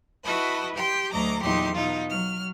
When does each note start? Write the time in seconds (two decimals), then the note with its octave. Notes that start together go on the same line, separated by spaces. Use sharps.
0.24 E4 F#4 B4 D#5 A5 B5
0.74 G4 G5 C6
1.12 D2 F#3 D#5 A#5 D6
1.42 E2 A#2 F#3 D#4 G4 C6
1.74 B2 D#4 F4
2.09 F#3 F6